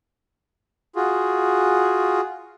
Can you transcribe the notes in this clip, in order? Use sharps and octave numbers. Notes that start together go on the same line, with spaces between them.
F4 F#4 G#4